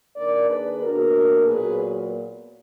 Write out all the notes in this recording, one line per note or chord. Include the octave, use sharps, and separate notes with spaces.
D#2 D#3 A#3 D4 A#4 D5
G#4 B4
B2 A#3 D4 F#4 A#4
A#2 F#3 B3 G#4 B4